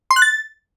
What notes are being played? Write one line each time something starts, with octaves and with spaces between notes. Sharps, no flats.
C6
F#6
A6